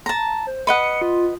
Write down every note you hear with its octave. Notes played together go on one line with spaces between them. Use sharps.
A5 A#5
C5
B4 D#5 F#5 C#7
F4